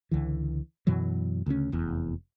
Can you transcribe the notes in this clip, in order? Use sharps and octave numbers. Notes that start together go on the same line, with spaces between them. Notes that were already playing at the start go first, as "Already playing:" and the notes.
C#2 D3 E3
F#2 B2 E3 F#3
D2 C#3 A3 C#4
F1 E2